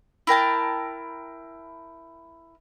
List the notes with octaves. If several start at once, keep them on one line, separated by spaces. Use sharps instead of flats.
E4 A#4 G5 A5